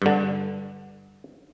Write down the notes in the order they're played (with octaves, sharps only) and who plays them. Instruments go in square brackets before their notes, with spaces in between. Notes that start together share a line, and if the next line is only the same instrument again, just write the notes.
[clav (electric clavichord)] G2 D3